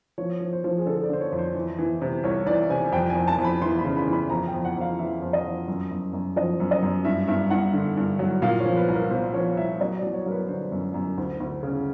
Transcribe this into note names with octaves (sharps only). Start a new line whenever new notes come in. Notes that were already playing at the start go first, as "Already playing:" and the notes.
F3 C#5
F3
C5
F3
G#4
D3 A4
D5
D3 C5
C#5
F2
C5
E3
E3
C3
C2 C#5
E3 D5
C3 G#5
F2 G5
G#5
F2
A5
F2
B5
E3 C6
B5
C#3
B5
E3
B5
F2 A#5
G5
F2
F#5
F2 F5
E3 E5
F2
D#5
F2
F#2
F#2
F#2
F3 D#5
F#2
D#5
F#2
G2 E5
G2 E5
G2 F#5
D3
G2
F#3
A#2 F5
C#5
F3
B4
C2
A#4
A#2 C5
F3 C#5
C2 E5
F#3 D#5
D5
F#3
C#5
F#3 A#4 B4
D3 C5
F#2
F#2
D2
D2
C#3